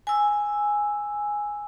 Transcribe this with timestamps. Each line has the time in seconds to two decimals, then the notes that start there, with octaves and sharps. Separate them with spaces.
0.07 G#5 E6